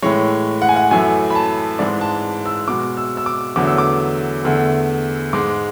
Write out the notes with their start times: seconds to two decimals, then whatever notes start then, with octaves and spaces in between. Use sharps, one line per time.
0.02 A2 E3 G#3 C#5
0.62 F#5
0.69 G#5
0.76 F#5
0.91 F#2 E3 A3 G#5
1.30 B5
1.35 A5
1.79 G#2 E3 G#3 D5
2.01 A5
2.46 E6
2.68 B2 G#3 D6
2.97 E6
3.17 E6
3.26 D6
3.56 E2 D3 F#3 A3 D6
3.67 E6
3.78 D6
4.44 E2 D3 A3
5.33 G#2 G#3 D6